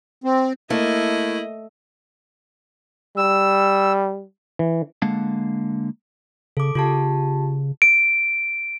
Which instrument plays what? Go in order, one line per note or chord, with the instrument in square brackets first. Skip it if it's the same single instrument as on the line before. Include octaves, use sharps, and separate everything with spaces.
[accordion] C4
[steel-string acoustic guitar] A3 [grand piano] A#3 [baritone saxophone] E4 [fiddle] D#5
[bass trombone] G3 [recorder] E6
[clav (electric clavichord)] E3
[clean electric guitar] D3 G#3 A#3 F5 F#5 A5
[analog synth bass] C#3 [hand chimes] A4 D6
[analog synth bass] C#3 [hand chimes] F4 G4 A5
[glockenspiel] D7